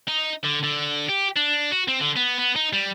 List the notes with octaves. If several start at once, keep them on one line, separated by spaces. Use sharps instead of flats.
D#4
D3
D3
G4
D4
F#4
C4
D3
B3
B3
D#4
G3